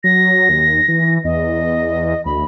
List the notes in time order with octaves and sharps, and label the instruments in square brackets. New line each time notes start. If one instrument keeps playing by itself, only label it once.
[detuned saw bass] F#3 [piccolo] A#6
[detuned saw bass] D#2
E3
[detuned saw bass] E2 [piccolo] D#5
[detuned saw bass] D2 [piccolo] B5